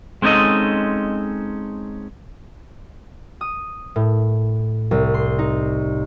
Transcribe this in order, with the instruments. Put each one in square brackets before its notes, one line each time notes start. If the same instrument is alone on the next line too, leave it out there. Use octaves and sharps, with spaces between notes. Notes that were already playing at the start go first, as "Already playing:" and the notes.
[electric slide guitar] G#3 C4 C#4 D#4 A4 D#5
[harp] D#6
A2
C2
C6
D#4